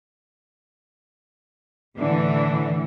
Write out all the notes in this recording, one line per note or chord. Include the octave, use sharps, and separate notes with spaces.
A2 D3 E3